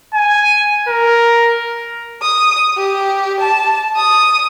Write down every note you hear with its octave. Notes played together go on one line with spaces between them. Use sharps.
G#5
A#4
D#6
G4
A5
D#6